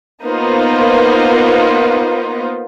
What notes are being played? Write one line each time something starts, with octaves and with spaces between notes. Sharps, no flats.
A#3 B3 D#4 F4 B4 C5